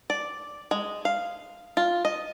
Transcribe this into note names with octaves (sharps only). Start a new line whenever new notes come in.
D5
G#3
F5
F4
D#5